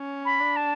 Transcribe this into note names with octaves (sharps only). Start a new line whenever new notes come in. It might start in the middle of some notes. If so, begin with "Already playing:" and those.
Already playing: C#4
B5
D4
A5